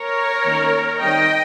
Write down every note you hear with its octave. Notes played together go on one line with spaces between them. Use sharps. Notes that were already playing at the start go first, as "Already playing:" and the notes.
Already playing: A#4 C#5
D#3 A#3 C#4
D#3 G3 C4 D#5 G5